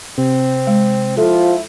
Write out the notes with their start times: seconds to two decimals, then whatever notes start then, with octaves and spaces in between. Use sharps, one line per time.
0.18 C3 C4
0.67 G#3
1.17 F3 E4 F4 A4